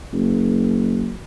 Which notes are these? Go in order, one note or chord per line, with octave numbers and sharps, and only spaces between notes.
F#1